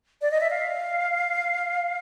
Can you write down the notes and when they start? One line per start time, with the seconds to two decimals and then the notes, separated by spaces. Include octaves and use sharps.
0.22 D5
0.31 D#5
0.41 E5
0.50 F5